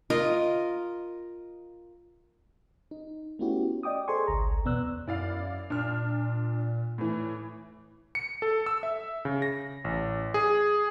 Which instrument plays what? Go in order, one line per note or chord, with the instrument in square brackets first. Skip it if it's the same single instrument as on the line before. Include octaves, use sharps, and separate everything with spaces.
[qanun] F4 A#4 D#5
[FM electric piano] D#4
A3 B3 C#4 E4 F#4 G4
D5 D#5 G5 D6 D#6
G#4 A4 C5 G#5 C6 C#6
G#1 C#2 A#5
E2 B2 B3 D5 E6 F#6
[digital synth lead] F#2 [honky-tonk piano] E4 D5 F5
[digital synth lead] A#2 [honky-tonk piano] D4 F6
[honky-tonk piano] A2 E3
[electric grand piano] C#7
A4
E6
E5
C#3
A#6
A1
G#4